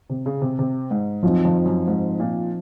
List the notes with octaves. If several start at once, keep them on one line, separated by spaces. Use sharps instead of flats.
C3
C#3
C3
C3
G#2
F#2 F3 C4 D#4
F2
F#2
G#2
A#2